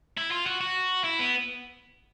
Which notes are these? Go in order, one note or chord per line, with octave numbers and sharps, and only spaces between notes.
E4
F4
F#4
F#4
E4
B3